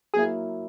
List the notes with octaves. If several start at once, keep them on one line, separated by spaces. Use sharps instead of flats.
F#3 A#3 E4 G#4